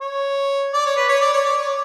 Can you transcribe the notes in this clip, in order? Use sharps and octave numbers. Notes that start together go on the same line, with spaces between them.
C#5
D5
C#5
B4
C#5
D5
C#5
D5
C#5